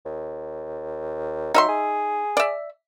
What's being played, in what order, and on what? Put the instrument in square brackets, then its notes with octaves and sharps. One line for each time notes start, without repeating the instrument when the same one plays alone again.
[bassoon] D#2
[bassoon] F#3 [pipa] D#4 E5 C6
[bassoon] G#4
[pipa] D5 E5